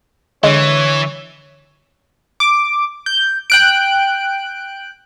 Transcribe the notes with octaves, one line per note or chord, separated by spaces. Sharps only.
D3 E3 G#3 C#5
D6
G6
G5 F#6 D7